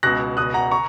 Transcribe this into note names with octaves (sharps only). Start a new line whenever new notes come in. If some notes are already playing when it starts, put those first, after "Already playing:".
C#2 B2 F#6 A#6
C#2 B2 D#6 F#6
F#5 A#5
A#5 C#6